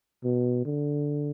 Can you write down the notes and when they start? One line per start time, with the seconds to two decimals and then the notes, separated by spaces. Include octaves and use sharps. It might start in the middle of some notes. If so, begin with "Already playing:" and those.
0.24 B2
0.65 D3